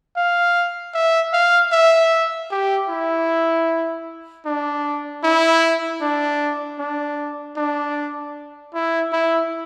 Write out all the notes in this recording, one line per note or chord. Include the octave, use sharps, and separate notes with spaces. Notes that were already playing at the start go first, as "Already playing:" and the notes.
F5
E5
F5
E5
G4
E4
D4
E4
D4
D4
D4
E4
E4